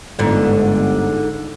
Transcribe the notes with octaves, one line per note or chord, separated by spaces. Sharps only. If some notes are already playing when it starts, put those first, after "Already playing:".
G1 G#2 D3